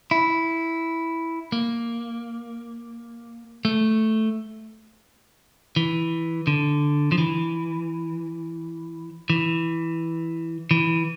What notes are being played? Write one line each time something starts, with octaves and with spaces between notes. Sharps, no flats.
E4
A#3
A3
E3
D3
F3
E3
E3
E3